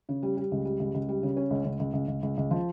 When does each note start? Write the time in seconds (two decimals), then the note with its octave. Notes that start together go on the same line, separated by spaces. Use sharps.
0.09 C#3
0.23 G3
0.37 G3
0.51 C#2
0.65 G3
0.79 C#2
0.94 C#2
1.09 G3
1.23 C#3
1.36 C#4
1.50 C#2
1.65 C#2
1.79 C#2
1.93 C#2
2.08 C#2
2.23 C#2
2.37 C#2
2.51 F3